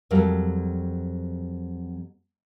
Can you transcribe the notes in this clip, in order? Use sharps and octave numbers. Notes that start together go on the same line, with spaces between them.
F2 F#3 G3 A#4 F5